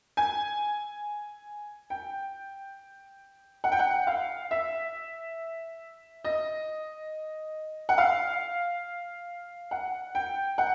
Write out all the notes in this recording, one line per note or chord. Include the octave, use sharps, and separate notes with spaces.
G#5
G5
F#5
G5
F#5
F5
E5
D#5
F#5
F5
F#5
G5
F#5